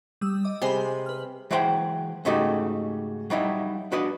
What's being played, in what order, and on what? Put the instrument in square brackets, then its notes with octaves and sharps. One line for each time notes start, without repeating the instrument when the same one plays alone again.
[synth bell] G3 D#6 E6
D#5 D6
[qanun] C3 G#3 C6 [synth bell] G#5 B5
[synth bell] B4 F6
[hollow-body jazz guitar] E3 F#3 G#3 C5 G5 B5
G#2 C#3 A3 D#4 F#4 G4
F#3 G3 D#4 E4
D4 F#4 B4 D#5